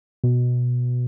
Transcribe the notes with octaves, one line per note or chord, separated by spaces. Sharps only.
B2